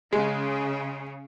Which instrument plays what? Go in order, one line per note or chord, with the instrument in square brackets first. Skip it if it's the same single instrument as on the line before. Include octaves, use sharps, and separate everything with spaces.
[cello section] C#3 [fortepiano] G#3